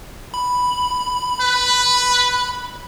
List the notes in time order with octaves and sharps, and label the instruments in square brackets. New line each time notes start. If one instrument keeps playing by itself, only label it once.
[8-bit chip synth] B5
[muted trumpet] B4